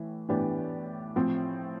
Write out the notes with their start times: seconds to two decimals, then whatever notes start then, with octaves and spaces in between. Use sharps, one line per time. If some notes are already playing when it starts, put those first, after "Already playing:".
Already playing: A2 E3
0.29 A2 E3 B3 D4 G4
1.16 A2 F3 C4